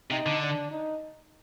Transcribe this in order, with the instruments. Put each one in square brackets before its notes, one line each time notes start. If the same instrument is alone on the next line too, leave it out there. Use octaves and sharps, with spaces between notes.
[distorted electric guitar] C3 [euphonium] D#4
[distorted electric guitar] D3
[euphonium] D4
D#4